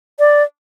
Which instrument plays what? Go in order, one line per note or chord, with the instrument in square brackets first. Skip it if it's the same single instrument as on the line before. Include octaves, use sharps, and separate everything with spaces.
[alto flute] D5